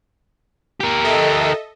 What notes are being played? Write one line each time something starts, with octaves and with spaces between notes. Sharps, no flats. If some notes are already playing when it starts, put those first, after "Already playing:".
G4 A#4
A4 D#5 E5